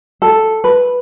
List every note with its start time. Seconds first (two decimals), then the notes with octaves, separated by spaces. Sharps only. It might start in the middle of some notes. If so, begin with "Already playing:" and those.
0.22 A4
0.64 B4